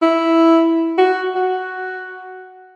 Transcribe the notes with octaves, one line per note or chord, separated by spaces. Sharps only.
E4
F#4
F#4